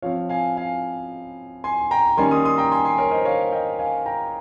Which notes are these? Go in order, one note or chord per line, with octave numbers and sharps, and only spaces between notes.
F3 C4 C#5 F5
F5 G#5
F5 G#5
G#5 C6
G5 A#5
D#3 G3 A#3 C#4 G#5 C6
C6 D#6
C6 D#6
G5 A#5
G#5 C6
G#5 C6
A#4 C#5
C5 D#5
C#5 F5
D#5 G5
F5 G#5
G5 A#5